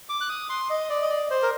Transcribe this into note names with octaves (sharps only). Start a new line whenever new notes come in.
D6
F#6
D#6
C6
D#5
D5
D#5
D5
C5
A#4